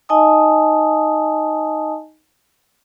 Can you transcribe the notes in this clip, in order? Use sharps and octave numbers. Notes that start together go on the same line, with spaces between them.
D#4 D#5 G#5 A5 D#6